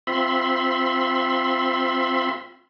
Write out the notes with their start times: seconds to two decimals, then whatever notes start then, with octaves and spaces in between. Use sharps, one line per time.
0.07 C4 F4 E5 B5 C6